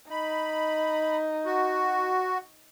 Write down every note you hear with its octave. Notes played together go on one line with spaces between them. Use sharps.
D#4 B5
F#4